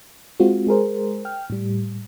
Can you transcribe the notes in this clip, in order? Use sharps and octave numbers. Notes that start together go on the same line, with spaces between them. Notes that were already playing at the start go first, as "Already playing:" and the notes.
G#3 C4 F4 F#4
G#3 G#4 A#4 C5
G5 F6
A2 G3